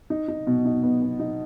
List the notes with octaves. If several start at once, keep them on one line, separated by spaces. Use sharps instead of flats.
D#4
D#4
B2
D#4
B3
B3
D#4